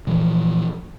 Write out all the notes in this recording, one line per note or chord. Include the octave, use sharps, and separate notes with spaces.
A#2 E3 F3